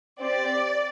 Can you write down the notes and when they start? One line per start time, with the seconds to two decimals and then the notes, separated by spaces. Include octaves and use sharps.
0.20 C4 G4 D5